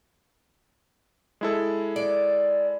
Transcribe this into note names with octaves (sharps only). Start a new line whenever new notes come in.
G#3 E4 A4
D5